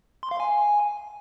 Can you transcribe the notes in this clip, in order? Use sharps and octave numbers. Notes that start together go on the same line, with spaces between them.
C6
F5
G#5